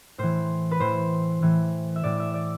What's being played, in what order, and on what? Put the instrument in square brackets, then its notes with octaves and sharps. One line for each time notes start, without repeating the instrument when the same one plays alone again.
[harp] A2 E3 C5
B4
A2 E3 C5
A2 E3
E5
A2 E3 D5
E5
D5